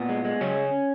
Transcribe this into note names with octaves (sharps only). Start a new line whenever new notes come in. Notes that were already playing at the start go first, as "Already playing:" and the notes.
Already playing: A#2 B3
G#3
G#3
C#3 F#3 C#4